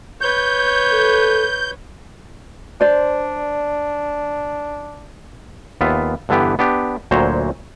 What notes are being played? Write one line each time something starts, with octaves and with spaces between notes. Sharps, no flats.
B4 C#5 G6
A4
D4 C5 D5
D#2 B3 F4 E5
G2 D3 E3 B3 G4
B3 D4 G4
D2 A#2 F#3 C5 C#5 A#5